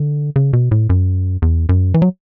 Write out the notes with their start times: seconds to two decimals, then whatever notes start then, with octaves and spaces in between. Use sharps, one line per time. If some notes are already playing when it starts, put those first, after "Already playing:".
Already playing: D3
0.36 C#3
0.53 B2
0.71 A2
0.90 F#2
1.42 E2
1.69 F#2
1.94 E3
2.02 F#3